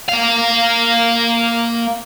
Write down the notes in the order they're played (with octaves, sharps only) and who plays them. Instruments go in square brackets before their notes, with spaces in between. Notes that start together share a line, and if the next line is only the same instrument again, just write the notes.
[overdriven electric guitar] A#3 F5